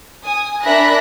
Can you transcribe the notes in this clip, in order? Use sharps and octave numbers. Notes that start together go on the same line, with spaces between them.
G#5 D#6
D4 A#4 E5 B5 F#6 A#6